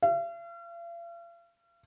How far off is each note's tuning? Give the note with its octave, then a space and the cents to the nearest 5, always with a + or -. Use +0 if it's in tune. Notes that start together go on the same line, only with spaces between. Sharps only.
F5 -45